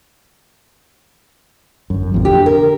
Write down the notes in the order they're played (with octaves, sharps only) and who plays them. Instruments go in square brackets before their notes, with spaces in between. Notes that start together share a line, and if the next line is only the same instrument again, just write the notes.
[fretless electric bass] G1 F#2
A1 F2 A#2
[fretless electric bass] D3 [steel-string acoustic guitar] G4
[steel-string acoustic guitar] A#4